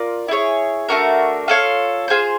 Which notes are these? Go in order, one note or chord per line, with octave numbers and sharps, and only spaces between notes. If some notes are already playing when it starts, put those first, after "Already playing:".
Already playing: F4 A#4 D5
E4 G#4 C#5
A3 D4 F#4 A#4
F4 A4 C#5 F5
F4 G#4 C5